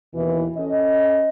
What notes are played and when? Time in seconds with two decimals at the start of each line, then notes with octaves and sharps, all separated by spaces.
0.13 D#2 B2 E3
0.57 C#4 A4 D#5